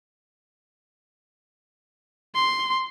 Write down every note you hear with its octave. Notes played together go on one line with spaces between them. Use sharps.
C6